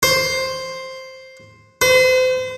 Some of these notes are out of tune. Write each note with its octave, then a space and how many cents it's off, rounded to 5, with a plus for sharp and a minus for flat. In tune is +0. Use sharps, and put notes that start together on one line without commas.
C5 +5
C5 -35